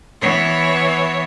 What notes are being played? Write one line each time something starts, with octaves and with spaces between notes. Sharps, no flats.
E3 B3 C#5